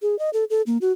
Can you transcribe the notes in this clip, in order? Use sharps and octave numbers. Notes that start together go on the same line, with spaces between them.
G#4
D#5
A4
A4
A#3
F#4